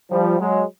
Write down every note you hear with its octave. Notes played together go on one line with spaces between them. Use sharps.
F3 G3
F#3 G#3